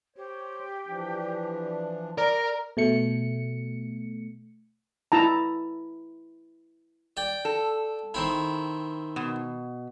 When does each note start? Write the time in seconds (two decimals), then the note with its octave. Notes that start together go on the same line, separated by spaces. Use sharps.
0.16 G4 C5 C#5
0.87 E3 F3 D4
2.18 A#4 D5 A#5
2.77 B2 A3 C#7
5.12 E4 A5 A#5
7.17 D5 G5
7.45 A4
8.14 D#3 C4 E4
9.16 B2